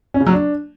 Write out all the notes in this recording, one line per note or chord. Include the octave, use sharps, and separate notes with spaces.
C#4
C#3
F#3
D4